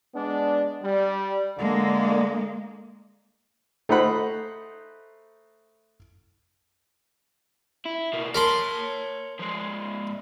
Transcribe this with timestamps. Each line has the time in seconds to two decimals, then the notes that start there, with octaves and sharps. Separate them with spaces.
0.14 G#3 B3 D4
0.83 G3
1.58 D3 G#3 A#3
3.89 A3 D#4 C5 F#5 B5
7.85 E4
8.13 B2 A#3
8.35 A#4 C#5 A5 B5 C6
9.39 F3 G#3